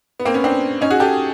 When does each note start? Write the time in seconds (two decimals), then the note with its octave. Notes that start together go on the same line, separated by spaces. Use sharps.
0.20 B3
0.25 A#3 C4
0.34 B3 C#4
0.44 C4 D4
0.81 C#4 D#4
0.90 F#4 G#4
1.00 G4 A4